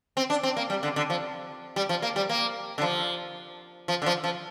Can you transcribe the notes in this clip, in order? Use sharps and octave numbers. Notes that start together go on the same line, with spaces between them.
C4
D4
C4
A#3
G3
D3
D3
F3
G3
F3
A#3
G3
A#3
D3
F3
F3
D3
F3
F3